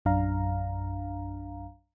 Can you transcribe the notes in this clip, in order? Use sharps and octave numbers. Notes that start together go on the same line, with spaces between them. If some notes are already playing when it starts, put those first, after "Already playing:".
A#1 F#2 D4 F5 A#5